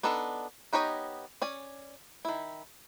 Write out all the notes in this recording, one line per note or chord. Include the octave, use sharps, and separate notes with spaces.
B3 D4 D#4 A4
B3 D#4 G4 C#5 D#5
C#4 D5 G#5
D#3 E4